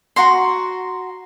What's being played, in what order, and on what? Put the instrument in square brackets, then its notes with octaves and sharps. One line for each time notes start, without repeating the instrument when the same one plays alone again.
[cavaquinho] F#4 A#5 C6